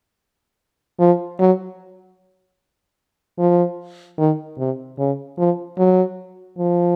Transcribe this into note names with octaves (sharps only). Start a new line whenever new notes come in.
F3
F#3
F3
D#3
C3
C#3
F3
F#3
F3